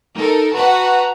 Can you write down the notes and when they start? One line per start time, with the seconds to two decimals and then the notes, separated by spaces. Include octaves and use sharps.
0.17 D#4 A4 A#4
0.52 F#4 B4 F#5 A5 A#5